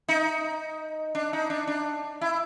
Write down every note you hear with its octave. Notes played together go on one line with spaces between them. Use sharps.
D#4
D4
D#4
D4
D4
E4